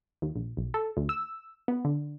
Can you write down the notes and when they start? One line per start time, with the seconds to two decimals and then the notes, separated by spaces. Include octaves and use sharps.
0.22 D#2
0.36 A#1
0.57 B1
0.74 A4
0.97 D2
1.09 E6
1.68 B3
1.85 D3